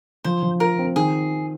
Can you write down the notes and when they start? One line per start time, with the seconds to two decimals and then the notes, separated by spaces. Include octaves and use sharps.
0.24 F3 C5
0.43 F3
0.60 F4 A#4
0.79 C4
0.96 D#3 G#4